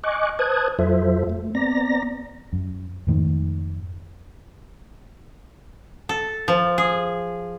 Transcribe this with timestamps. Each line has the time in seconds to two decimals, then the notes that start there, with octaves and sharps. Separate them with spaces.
0.03 D#5 G#5 C#6 D6 F#6
0.39 B4 C5 A5 D#6 F#6 G#6
0.79 F2 F#3 F4 A4 C5 E5
1.30 A3
1.55 B3 C4 D5 A#5 A#6
2.53 F#2
3.07 F2 G#2 D#3 A3
6.09 A4
6.48 F3
6.78 G#4